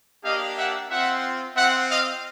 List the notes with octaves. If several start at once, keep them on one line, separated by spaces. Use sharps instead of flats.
A#3 D4 G4 D#5 F5
E5 F#5
C4 F4 E5 F#5
C4 F4 E5 F#5
D#5 F5